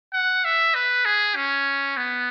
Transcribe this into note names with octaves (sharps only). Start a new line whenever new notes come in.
F#5
E5
B4
G#4
C#4
B3